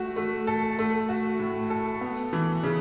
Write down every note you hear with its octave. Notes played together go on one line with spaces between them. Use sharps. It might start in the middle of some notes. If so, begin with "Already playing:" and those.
Already playing: A3 F#4
A3
A4
A3
F#4
A2
A4
B3
E3
C#3